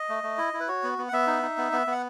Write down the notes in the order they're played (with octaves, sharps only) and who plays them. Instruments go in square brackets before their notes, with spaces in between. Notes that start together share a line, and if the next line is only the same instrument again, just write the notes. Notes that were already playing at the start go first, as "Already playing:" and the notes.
Already playing: [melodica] D#5
A3
A3
E4
E4
B4
F#4 C#5
B3
B3
F#5
B3 E5
D#4
D#4
B3
B3
B3 F#5